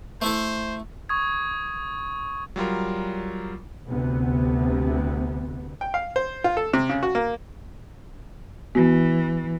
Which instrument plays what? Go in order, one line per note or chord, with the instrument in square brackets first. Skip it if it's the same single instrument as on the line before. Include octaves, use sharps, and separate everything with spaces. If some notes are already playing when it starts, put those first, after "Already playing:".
[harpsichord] A3 E4 A4 [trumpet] C5
[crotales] C#6 D#6 G#6
[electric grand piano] F#3 G3 F4 A#4
[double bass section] D2 C3 B3
[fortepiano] G5
F5
C5
F4
A4
C3
C#3
F#4
A#3
[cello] E3 [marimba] B3 F#4